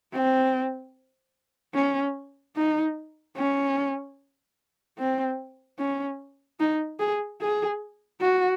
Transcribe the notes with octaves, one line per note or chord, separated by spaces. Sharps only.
C4
C#4
D#4
C#4
C4
C#4
D#4
G#4
G#4
F#4